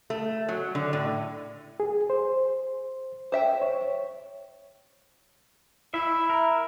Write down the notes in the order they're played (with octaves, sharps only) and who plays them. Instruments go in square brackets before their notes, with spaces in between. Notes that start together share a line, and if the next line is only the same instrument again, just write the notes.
[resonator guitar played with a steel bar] A3
F#3
D3
A2
[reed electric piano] G#4
C5
[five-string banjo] C5 E5 G5
[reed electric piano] C#5
[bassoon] E4 [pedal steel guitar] E5
[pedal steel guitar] A#4